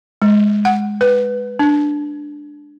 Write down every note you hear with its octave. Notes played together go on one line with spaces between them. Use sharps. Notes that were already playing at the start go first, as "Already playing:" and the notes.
G#3
F#5
B4
D4